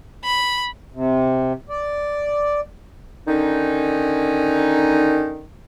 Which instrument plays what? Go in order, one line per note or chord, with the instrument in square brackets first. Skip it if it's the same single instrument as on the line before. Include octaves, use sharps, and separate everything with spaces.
[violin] B5
[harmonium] C3
D5
[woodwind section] D3 D#3 C#4 D#4